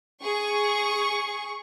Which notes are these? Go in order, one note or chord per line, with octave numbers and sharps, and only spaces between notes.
G#4 C#6